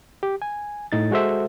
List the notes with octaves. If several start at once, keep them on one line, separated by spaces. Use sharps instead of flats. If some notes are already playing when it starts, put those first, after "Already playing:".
G4
G#5
A2 D#4 A6
G#3 F#4 A4 C5 E5